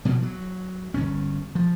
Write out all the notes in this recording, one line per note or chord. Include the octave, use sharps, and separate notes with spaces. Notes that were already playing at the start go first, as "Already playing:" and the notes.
B2 E3 F3 G3
F#3
G1 G2 C#4
F3